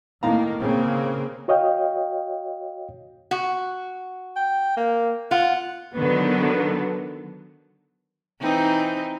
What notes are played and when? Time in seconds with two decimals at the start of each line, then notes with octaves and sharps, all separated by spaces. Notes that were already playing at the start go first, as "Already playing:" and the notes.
0.23 A2 D#3 A#3 F5 A#5
0.60 C#3 A#3 C4
1.48 F#4 C#5 D#5 F5 G5
3.31 F#4
4.36 G5
4.77 A#3
5.31 F4 F#5
5.96 D3 D#3 F#3 B3
8.41 E3 C4 D#4